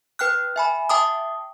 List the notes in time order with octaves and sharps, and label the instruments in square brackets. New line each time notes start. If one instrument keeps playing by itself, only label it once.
[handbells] B4 G5 F6 F#6
E5 G#5 B5
E5 G5 A5 D6 D#6